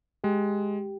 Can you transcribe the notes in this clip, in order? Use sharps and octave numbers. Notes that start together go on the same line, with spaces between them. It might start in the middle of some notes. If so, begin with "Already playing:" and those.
G#3 G4